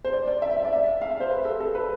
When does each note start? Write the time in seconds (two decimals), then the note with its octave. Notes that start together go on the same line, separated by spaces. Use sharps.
0.05 C5
0.13 D5
0.27 D5
0.42 E5
0.57 E5
0.65 D5
0.73 E5
1.01 F5
1.10 E5
1.20 C5
1.30 B4
1.45 A4
1.60 A4
1.75 B4